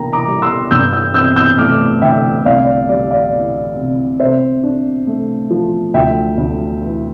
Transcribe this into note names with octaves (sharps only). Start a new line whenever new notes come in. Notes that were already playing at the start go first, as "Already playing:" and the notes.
Already playing: A#3 D4 G5 A#5
A#5 D6
G3
C6 E6
G2 E6 G6
E6 G6
C4 E6 G6
E6 G6
A3 D6 F6
D3 E5 G5
C2 D5 F5
D5
G3 D5
D5 F5
E3
C3
C3 C5 E5
D4
A3
F3
D2 E5 G5
D2
E3